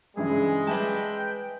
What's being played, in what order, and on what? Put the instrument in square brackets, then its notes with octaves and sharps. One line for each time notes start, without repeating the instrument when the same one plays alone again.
[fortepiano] G2 C#3 E3 [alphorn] G#3 [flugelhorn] G#4
[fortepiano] G3 [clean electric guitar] B4 E5 A5 [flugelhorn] G5